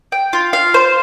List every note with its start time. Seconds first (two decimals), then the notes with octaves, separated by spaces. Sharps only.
0.12 G5
0.33 F4
0.53 F5
0.74 C5